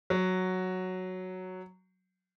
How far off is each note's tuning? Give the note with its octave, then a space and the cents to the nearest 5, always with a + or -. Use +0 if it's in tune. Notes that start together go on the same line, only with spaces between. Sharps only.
F#3 +0